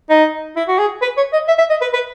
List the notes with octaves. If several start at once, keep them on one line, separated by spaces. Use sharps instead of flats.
D#4
E4
F#4
G#4
B4
C#5
D#5
E5
E5
D#5
B4
B4